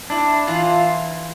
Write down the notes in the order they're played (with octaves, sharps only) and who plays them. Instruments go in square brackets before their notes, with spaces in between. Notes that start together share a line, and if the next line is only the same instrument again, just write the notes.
[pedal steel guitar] D4 [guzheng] E4
[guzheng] E3 [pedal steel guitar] F4